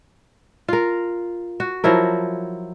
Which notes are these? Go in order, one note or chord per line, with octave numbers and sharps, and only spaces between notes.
F4 A#4
F#4
F3 F#3 E4 A#4